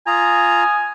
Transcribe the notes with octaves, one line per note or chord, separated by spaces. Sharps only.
F4 G#5 A#5 D#6